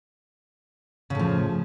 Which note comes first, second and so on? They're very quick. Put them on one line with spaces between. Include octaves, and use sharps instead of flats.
C#3 A2 F3